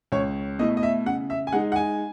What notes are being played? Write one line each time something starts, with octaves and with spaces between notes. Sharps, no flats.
C#2 C#5
B2 A3 E4 D#5
D#5
E5
C#3 F#5
E5
G#5
G#3 D#4 F#5
F#5
G#5